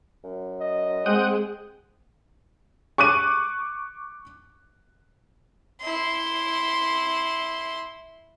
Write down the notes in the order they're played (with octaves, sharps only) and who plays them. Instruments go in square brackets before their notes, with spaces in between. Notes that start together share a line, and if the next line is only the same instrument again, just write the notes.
[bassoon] F#2
[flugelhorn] D#5
[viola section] G#3 [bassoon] C4 [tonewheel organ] F#5 G5 D#6
[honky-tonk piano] C#6 D6 F#6 D#7
[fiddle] E4 C6